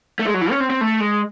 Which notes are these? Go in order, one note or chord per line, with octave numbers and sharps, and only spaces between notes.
A3
G#3
F#3
E3
C#4
C4
C4
A3
G#3